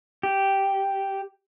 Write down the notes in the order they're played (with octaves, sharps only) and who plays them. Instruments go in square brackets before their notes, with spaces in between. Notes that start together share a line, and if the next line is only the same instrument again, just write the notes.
[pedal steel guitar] G4